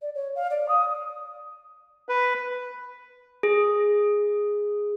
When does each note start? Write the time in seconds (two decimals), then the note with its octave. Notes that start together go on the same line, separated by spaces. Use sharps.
0.01 D5
0.14 C#5
0.35 F5
0.50 D5
0.68 D#6
2.09 B4
3.43 G#4